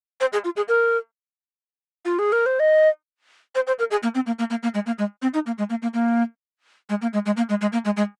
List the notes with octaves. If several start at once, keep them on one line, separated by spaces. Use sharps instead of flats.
C5
G#4
F4
G#4
A#4
F4
G#4
A#4
C5
D#5
C5
C5
A#4
G#4
A#3
C4
A#3
A#3
A#3
A#3
G#3
A#3
G#3
C4
D#4
A#3
G#3
A#3
A#3
A#3
G#3
A#3
G#3
G#3
A#3
G#3
G#3
A#3
G#3
G#3